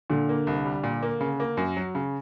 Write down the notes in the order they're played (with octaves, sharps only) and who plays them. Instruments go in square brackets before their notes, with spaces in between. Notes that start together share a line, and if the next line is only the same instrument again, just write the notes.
[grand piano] A#2 [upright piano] D3
[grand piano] A#3
C2
G3
A#2
A#3
C#3
A#3
F#2
F#3
C#3